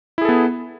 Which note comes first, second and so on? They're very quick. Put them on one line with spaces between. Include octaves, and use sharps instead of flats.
E4 G#4 A4 B3